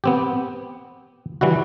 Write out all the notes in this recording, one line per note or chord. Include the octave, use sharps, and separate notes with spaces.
B3 C4 G4
E3 G3 E4 F#4